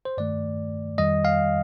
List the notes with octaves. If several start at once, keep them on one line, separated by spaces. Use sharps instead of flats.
C5
G2 D#3 A3 D5
F2 D#3 G3 D#5
F5